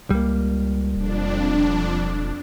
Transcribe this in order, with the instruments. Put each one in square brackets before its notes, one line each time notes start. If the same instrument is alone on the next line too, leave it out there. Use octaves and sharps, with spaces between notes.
[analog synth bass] C#2 [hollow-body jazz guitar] G3 A#3
[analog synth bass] E1 [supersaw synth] F2 D4